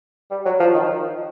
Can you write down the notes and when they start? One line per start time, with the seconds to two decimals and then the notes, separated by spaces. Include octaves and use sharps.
0.31 G3
0.45 F#3
0.60 F3
0.74 D#3